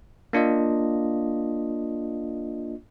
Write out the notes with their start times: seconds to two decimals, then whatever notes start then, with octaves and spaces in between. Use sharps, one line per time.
0.33 A#3 D4 F4 D#5